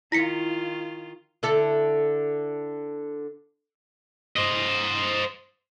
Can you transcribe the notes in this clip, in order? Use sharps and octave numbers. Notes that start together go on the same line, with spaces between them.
D#3 E4 F4 A#6 B6 C#7
D3 E4 A4
C5 D#5